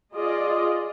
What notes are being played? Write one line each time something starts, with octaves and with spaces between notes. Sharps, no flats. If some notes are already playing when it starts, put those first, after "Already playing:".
F4 G#4 D5 D#5